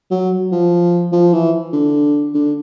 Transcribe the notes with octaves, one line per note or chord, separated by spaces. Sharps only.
F#3
F3
F3
E3
D3
D3